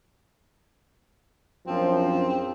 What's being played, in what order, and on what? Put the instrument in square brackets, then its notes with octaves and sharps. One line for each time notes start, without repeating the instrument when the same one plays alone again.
[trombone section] A#1 F#2 [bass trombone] F3 [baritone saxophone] C4